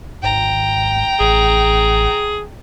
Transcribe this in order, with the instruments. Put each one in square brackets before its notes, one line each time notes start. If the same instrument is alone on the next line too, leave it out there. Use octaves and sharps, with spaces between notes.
[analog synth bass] G#1 [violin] G5 A#5
[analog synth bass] A1 [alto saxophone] G#4